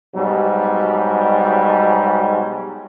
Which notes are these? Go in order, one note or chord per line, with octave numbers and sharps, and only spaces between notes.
G#2 B2 F#3 G3